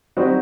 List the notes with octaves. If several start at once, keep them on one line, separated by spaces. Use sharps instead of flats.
G3 C4 D#4 F#4